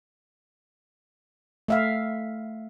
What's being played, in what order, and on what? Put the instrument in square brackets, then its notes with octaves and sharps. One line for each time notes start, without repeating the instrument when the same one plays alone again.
[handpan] A3 E5 F5